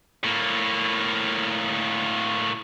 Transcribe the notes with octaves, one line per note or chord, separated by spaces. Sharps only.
A2 A#3